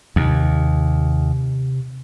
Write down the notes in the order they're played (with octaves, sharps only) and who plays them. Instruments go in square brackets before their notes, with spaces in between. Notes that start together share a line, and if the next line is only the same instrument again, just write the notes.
[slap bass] D#2 [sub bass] C3